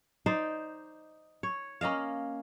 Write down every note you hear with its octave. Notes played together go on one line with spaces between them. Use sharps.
D#4 C5 D5
C#5
A#3 C#4 D#5 F5